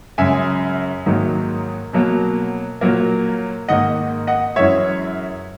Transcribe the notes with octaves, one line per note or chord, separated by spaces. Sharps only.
F#2 C#3 G#3 E5 G#5
G#2 D#3 F#3 A#3
B2 F#3 A#3
A#2 F#3 A#3
G#2 D#3 A#3 D#5 F#5
D#5 F#5
F#2 E3 G#3 C#5 E5